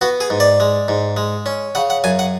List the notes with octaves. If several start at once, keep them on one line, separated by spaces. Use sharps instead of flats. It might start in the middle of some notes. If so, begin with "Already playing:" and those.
B3 F#4
G#4
G#2
D5
G#3
G#2
G#3
C#4
C#3 F#5
F#5
F#2 G#5
F#5